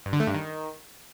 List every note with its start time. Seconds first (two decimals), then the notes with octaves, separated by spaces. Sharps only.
0.06 G2
0.13 D3
0.20 A3
0.27 G2
0.34 D#3